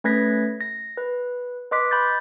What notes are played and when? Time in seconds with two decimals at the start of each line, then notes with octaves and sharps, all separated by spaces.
0.04 A3 C#4 B4 G#6 A#6 B6
0.61 A#6
0.97 B4
1.71 B4 D#5 C6 D6 F#6 B6
1.91 B5 G6 A6